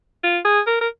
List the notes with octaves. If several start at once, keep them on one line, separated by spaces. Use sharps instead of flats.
F4
G#4
A#4
A#4